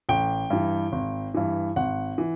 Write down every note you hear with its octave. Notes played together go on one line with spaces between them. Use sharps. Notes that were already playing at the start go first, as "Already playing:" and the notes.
A1 G5
G2 E3
G#1
G2 E3
G#1 F#5
E3